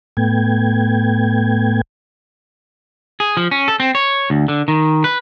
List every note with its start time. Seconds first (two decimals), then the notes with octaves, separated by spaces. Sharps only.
0.17 A2 A3 B3 G5 G#6
3.20 G#4
3.37 F3
3.51 C#4
3.68 A4
3.80 C4
3.95 C#5
4.30 D2
4.48 D3
4.68 D#3
5.04 B4